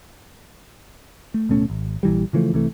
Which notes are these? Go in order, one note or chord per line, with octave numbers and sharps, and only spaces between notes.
A3
D1 B2 A3 C#4
G#1
A#1 E3 G3
C#3 E3 F3 A3
C2 C3 E3 A3